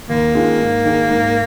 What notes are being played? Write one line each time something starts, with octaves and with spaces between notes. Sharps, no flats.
D#2 A#3
D#3 G#3 C#4 F4
G#2
D#3 G#3
G#2